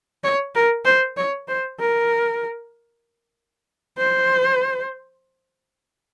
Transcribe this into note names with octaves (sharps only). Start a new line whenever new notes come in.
C#5
A#4
C5
C#5
C5
A#4
C5